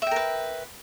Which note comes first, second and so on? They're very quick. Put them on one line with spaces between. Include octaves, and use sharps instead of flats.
E5 G5 A#4 B4